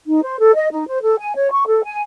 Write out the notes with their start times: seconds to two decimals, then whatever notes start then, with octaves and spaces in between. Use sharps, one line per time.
0.08 D#4
0.23 C5
0.39 A4
0.55 D#5
0.71 D#4
0.87 C5
1.03 A4
1.19 G#5
1.35 C#5
1.51 C#6
1.67 A4
1.83 G#5